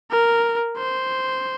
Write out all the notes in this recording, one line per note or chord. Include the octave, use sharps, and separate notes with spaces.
A#4
C5